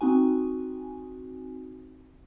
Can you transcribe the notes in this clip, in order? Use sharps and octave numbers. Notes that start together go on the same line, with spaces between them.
C4 D#4 F#4 G#5